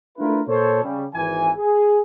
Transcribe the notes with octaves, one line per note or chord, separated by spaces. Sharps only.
A3 D4 E4 F4 A#4 B4
A#2 A4 C5 C#5
C#3 G3
G#1 E3 G#5
G#4